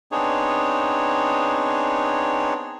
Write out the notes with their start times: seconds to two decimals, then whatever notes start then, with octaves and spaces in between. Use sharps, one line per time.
0.12 B3 C4 D4 D#4 G#4 C#5